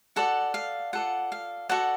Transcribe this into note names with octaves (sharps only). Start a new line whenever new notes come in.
F#4 A4 D5 F#5
F5
F4 A4 D5 F#5
F5
F#4 A4 D5 F#5